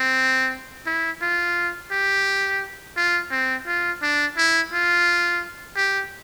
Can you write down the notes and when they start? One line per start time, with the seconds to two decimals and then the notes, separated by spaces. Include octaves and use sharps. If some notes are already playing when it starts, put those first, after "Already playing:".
Already playing: C4
0.86 E4
1.22 F4
1.91 G4
2.97 F4
3.31 C4
3.67 F4
4.02 D4
4.37 E4
4.72 F4
5.76 G4